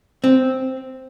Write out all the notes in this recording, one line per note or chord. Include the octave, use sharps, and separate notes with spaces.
C4